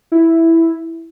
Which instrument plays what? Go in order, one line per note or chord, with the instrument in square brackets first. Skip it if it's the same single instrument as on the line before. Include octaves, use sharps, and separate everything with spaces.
[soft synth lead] E4